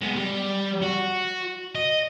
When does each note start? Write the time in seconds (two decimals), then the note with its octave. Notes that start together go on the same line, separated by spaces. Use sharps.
0.02 G#3 B3
0.16 G3
0.81 F#4
1.75 D#5